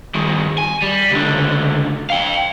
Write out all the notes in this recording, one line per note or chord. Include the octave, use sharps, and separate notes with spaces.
G2 D#3
G#5
G3
C#2 D3
F5 G5